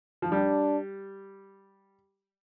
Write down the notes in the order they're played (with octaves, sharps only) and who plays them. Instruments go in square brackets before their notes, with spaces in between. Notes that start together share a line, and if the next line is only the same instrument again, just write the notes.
[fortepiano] F3
[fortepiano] G3 [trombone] D4